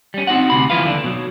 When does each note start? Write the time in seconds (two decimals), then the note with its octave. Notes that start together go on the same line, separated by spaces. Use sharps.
0.14 G3 C#4
0.27 C4 D#4 F#4 F#5
0.50 D2 C3 B5
0.70 D2 D#3 F3 E4 B4 F5
0.84 D#2 D3 C#4 D4
1.04 B2 F#3